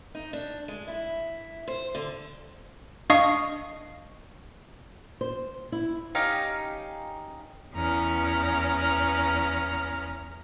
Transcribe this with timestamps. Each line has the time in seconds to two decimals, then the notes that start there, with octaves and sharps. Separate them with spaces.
0.15 D#4
0.33 D4
0.68 G#3
0.88 E4
1.68 C5
1.95 D3
3.10 D4 D#5 F5 C#6 D#6 C7
5.21 C5
5.72 E4
6.15 C#4 D#4 G4 F5
7.74 E2 B3 C#4 A#5 F6